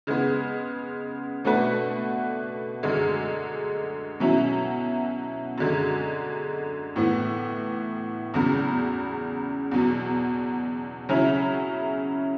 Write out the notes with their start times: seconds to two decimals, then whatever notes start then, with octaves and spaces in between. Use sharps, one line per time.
0.07 C#3 G#3 B3
1.44 B2 A3 D4 F#4 B4
2.83 F#2 D3 G#3
4.20 B2 F#3 C#4 E4
5.58 F#2 D3 G#3
6.96 A2 E3 B3
8.34 E2 C#3 F#3
9.71 E2 B2 F#3
11.09 C#3 F#3 C#4 E4